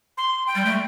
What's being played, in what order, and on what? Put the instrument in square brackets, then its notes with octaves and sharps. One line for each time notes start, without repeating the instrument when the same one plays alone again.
[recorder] C6
G5
[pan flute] G3
A3